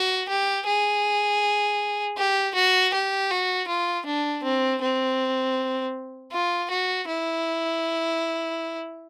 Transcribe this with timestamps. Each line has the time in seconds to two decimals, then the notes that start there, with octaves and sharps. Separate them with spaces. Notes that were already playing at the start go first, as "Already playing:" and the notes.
Already playing: F#4
0.29 G4
0.67 G#4
2.17 G4
2.55 F#4
2.93 G4
3.31 F#4
3.68 F4
4.06 D4
4.44 C4
4.82 C4
6.32 F4
6.70 F#4
7.08 E4